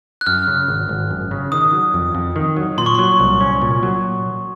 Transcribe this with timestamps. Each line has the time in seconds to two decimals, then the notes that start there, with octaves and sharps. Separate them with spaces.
0.21 F#6
0.26 F#2 F6
0.47 C#3
0.68 G#1
0.89 G#1
1.11 F#2
1.31 C#3
1.52 D#3 D#6
1.73 F#3
1.94 F2
2.15 F2
2.36 D#3
2.57 F#3
2.78 A#2 C6
2.86 C#6
2.95 F#3 C6
3.19 C2
3.41 C#4
3.62 A#2
3.83 F#3